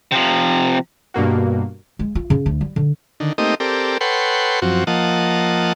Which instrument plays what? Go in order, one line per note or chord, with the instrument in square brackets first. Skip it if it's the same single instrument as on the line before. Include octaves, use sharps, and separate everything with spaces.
[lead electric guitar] C3 F3
[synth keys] G2 B2 A#3 F#4
[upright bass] G#3
F4
C#3
D2
G3
D3
[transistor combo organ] D3 D#3
A3 A#3 C4 D#4 G4 D#5
C4 G4 A4 A#4 D5
A4 B4 C#5 F#5 G5 C6
F#2 F3 C4 F#4
F3 A#3 D#5 F#5 A5